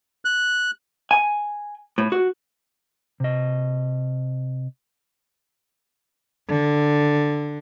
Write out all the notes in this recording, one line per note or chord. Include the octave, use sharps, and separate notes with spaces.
F#6
G#5
A2
F#4
C3 D#5
D3